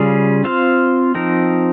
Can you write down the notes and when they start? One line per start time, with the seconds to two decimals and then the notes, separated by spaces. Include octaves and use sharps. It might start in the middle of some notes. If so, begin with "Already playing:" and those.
Already playing: C#3 G3 C#4 F4 G#4
0.44 C4 F4 C5 F5
1.15 F3 C4 D#4 A#4